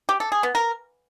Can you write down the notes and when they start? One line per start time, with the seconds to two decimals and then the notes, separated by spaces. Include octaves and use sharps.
0.09 G4
0.20 A4
0.32 G#4
0.43 B3
0.55 A#4